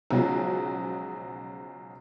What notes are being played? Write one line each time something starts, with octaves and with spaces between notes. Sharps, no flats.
B1 C#3 F3 F#3 G#3